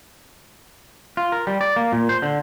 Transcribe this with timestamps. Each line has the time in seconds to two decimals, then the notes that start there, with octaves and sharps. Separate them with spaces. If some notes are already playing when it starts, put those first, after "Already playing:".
1.17 F4
1.32 A#4
1.47 G3
1.61 D5
1.76 A#3
1.93 A#2
2.09 C5
2.22 D3